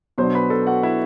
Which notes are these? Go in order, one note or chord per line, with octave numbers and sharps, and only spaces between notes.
B2 F#3 B3 D4 C5 C6
B4 B5
A4 A5
F#4 F#5
E4 E5